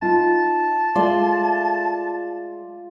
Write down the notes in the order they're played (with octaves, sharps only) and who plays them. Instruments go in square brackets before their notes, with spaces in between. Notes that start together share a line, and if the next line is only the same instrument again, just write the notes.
[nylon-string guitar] D#4 F4 [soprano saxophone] A5
[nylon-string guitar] G#3 A3 [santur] F4 D5 C6